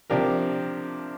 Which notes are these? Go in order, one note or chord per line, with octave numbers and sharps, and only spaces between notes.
C3 F3 D4 G4 A#4